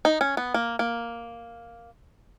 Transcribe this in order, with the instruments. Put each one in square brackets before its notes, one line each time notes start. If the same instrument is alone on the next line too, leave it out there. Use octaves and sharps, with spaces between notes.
[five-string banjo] D#4
C#4
B3
A#3
A#3